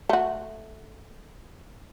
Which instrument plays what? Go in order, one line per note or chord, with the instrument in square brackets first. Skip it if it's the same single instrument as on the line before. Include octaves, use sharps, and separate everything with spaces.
[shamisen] A3 F#4